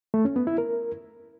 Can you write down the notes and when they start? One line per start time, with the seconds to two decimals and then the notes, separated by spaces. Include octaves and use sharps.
0.14 A3
0.25 C#4
0.36 B3
0.47 E4
0.58 A#4